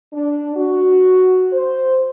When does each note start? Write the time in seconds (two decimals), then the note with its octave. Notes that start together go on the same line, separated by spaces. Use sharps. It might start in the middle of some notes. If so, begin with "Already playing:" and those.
0.13 D4
0.56 F#4
1.52 C5